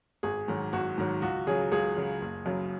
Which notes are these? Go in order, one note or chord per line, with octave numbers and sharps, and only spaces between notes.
G#1 G#4
G#2 D#3 F#3
G#1 F#4
G#2 D#3 F#3
C#2 F#4
C#3 F#3 G#4
C#2 G#4
C#3 F#3
F#1
F#2 C#3 F#3